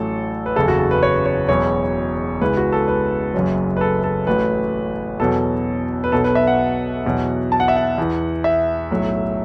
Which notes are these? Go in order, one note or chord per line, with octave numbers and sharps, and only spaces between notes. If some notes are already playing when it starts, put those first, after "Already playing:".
Already playing: A1 A2 F#3 A4
B4
F#1 E2 C#3 A4
F#4
A4
B4
C#5
C#5
E1 E2 B2 F#3 C#5
C#2 C#3 E3 B4
F#4
A4
B4
F#1 F#2 F#3
B4
A4
A4
A1 A2 F#3 B4
E2 B2 F#3 A4
B4
B1 B2 F#3 A4
B4
E5
F#5
E2 B2 F#3
A5
F#5
E5
F#5
E2 E3
E5
B1 A2 F#3